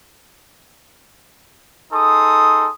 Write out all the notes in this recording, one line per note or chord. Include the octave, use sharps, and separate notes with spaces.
D#4 G#4 A4 C6 D#6